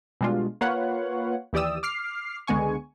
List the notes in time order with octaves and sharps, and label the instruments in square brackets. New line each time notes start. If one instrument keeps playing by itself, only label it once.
[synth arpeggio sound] B2 G3 G#3 D4 F4
A#3 F4 B4 C#5 F5 F#5
D#2 E3 G4 D5 D#6 E6
D6 F6 C7
C#2 D3 G#3 B3 G#5 C#6